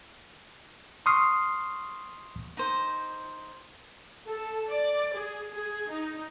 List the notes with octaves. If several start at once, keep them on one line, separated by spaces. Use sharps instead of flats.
C6 C#6 D#6 F6 C7
D#4 C5
A4
D5
G#4
G#4
D#4